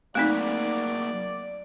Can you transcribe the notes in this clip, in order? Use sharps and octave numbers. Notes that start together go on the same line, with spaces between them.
F#3 A3 A#3 C4 D#4 F#4 D5